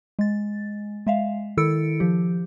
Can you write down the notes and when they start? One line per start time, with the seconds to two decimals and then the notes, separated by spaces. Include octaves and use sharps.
0.19 G#3 A6
1.07 G#3 E5 F5
1.57 D#3 E4 A4 E6 C#7 D7
2.00 F3 G4